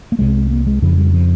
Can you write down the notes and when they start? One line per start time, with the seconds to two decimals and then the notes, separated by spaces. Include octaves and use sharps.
0.12 A#3
0.19 C2 C3 G#3
0.51 A#3
0.67 G#3
0.82 F2 C#3 F3
0.98 G3
1.14 F3